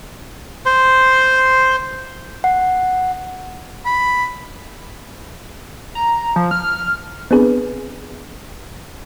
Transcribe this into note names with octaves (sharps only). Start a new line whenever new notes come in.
C5 C6
F#5
B5
A#5
F3
F6
B3 C4 D4 G#4 B4